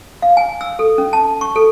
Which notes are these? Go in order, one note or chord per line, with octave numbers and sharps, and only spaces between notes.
F5
G#5
E6
A4
C#4
A5
C#6
A4